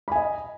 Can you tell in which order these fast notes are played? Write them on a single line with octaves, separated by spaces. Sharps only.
B5 G#5 D#5